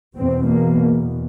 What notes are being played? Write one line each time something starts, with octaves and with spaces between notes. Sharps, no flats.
E2 B2 C4
A#3